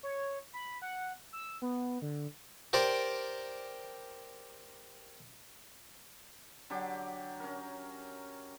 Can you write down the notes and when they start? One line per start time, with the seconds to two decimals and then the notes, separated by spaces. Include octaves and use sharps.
0.03 C#5
0.53 B5
0.82 F#5
1.33 E6
1.62 B3
2.02 D3
2.73 G4 A#4 C5 D5
6.70 D3 F#3 G4 D6
7.40 C#4 A#4